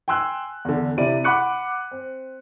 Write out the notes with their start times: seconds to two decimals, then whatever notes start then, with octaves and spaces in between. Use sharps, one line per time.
0.08 G5 G#5 C6 E6 F#6
0.65 E2 D3
0.97 C3 E4 D5 D#7
1.24 F#5 B5 D6 F#6 C#7
1.91 C4